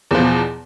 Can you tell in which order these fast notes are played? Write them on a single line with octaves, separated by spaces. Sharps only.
E2 F3 B2